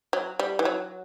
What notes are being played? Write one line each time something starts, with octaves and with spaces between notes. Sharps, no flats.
F#3
G3
E3
F#3